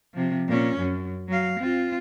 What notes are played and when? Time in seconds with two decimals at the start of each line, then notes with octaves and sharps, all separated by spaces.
0.14 C3 F3
0.48 A#2 C#4
0.78 F#2
1.28 F#3 F5
1.59 C4 F4